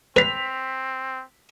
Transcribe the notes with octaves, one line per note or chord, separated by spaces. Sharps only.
C4 B4 B6 F7